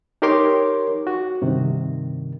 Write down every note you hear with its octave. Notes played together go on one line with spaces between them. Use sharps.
D#4 G4 A#4 C#5 C6 D6
F#4
G2 C3 D#3